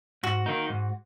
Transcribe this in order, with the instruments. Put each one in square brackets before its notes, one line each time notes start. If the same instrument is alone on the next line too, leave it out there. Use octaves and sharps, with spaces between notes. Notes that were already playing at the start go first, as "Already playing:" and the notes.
[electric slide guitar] G#2 [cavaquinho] F#4
[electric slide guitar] D#3 A#3 D#4
G#2